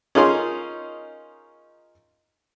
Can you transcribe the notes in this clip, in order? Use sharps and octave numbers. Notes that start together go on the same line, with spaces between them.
C#4 D#4 F4 G#4 A#4 C6